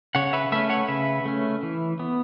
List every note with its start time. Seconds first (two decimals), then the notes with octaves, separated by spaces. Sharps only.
0.15 C#3 C#5 F#5
0.33 B4 E5
0.52 A3 C#4 B4 E5
0.70 C#5 F#5
0.88 C#3 B4 E5
1.25 A3 C#4
1.63 E3
1.99 B3